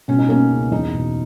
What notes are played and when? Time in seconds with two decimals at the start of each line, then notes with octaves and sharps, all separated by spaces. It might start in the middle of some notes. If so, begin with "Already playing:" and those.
0.08 B2 C#4
0.19 D#4
0.29 A#3 C#4
0.51 C#2
0.71 E2 D#4
0.94 B2